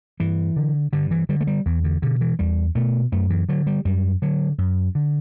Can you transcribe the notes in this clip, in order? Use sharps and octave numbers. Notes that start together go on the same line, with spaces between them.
G2 E3
D3
G2 D3
E3
D3 G3
A3
G3
E2 E3
D3
B2 D3
E3
E2 G3
B2 A3
F#2 A3
E3
D3 F#3
G3
F#2 G3
D3 F#3
F#2
D3